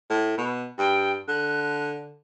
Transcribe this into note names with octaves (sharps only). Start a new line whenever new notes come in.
A2
B2
G2 G5
D3 F#6